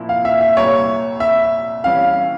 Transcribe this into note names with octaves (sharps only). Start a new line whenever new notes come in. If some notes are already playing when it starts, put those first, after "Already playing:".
Already playing: A#2 F3 A#3 E4
F5
E5
E5
C2 C3 G3 A#3 C#5
E5
E3 G3 C#4 F5